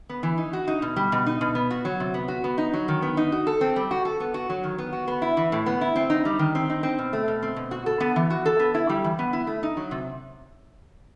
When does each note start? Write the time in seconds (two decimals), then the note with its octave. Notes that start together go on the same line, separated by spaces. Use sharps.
0.09 B3
0.23 E3
0.38 D#4
0.53 F#4
0.68 D#4
0.82 B2
0.96 G3
1.12 B2
1.26 D#4
1.41 B2
1.55 B3
1.71 F#4
1.85 F#3
2.00 C3
2.14 B3
2.28 F#4
2.44 B3
2.58 D#4
2.73 F#3
2.88 D#3
3.02 B3
3.17 D#4
3.32 F#4
3.47 A4
3.61 C4
3.76 G3
3.91 F#4
4.05 A4
4.20 B3
4.34 F#4
4.50 F#3
4.64 D#3
4.78 B3
4.93 F#4
5.08 B3
5.22 E4
5.37 E3
5.52 A2
5.66 B3
5.81 E4
5.96 C4
6.10 D#4
6.25 G3
6.39 D#3
6.55 C4
6.70 D#4
6.83 C4
6.98 B2
7.13 A3
7.28 B2
7.43 C4
7.56 B2
7.71 F#4
7.86 A4
8.00 B3
8.16 E3
8.30 F#4
8.46 A4
8.59 B3
8.74 E4
8.89 G3
9.04 E3
9.19 B3
9.33 E4
9.47 A3
9.63 D#4
9.77 F#3
9.91 C3